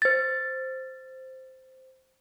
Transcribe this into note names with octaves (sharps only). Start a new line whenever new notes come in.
C5 A6